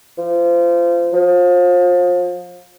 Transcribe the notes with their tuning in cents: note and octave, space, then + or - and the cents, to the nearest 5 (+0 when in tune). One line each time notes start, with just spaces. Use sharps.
F3 -25
F3 +30